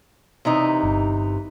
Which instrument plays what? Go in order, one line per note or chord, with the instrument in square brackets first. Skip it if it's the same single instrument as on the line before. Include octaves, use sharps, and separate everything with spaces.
[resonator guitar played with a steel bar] C3 E3 D#4
[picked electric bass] G1